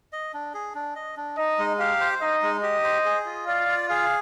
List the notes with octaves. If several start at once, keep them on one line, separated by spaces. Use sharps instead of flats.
D#5
D4
G#4
D4
D#5
D4
D#4 D#5
G#3
G4 F5
C5
D#4 D#5
G#3
G4 D#5
C5
G#4
F4
D5 F5
F4
G#4 F5